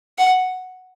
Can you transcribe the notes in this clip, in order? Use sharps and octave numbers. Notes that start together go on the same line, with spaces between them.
F#5